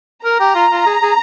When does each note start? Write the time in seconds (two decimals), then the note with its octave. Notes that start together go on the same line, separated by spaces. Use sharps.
0.25 A#4 A#5
0.40 G4
0.55 F4
0.71 F4
0.86 G#4
1.02 G#4